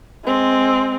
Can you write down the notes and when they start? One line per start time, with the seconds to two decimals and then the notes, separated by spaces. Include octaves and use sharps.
0.25 G#3 C4